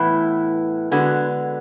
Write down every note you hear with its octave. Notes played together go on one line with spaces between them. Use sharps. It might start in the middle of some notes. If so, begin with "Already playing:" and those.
Already playing: A2 E3 B3 E4
D3 G#3 B3 F#4